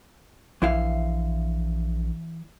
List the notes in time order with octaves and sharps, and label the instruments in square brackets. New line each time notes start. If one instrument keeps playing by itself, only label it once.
[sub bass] A#1 [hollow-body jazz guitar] E3 E4 F5